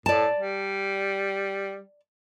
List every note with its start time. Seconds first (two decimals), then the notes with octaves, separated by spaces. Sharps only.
0.06 A2 D5 A5
0.39 G3